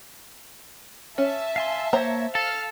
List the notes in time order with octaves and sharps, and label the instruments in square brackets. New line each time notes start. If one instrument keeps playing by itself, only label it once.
[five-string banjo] C#4 [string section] E5 A5
[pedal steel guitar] F5 G#5 C6
[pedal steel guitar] A#3 C#5 [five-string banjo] C5 A#5
[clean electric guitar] A4 [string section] F5 F6 [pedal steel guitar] A5